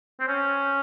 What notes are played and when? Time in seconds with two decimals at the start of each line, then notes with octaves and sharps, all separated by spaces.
0.20 C4
0.28 C#4